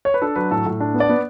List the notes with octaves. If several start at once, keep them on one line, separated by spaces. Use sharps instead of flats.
C#5
B4
D4 A4
F#3 B4
A2 A4
A2
D4
B3
D5
B3